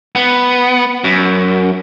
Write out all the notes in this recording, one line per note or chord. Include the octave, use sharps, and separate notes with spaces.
B3
F#2